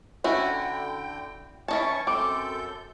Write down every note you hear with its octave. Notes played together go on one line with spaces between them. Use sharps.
D3 C#4 E4 F#4 G5
E3 C#4 D#4 A5 C#6
F#2 C4 A4 D6 G6